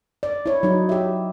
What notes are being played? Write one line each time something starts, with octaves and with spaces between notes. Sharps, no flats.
D5
E4 C#5
F#3 D#4
G4 E5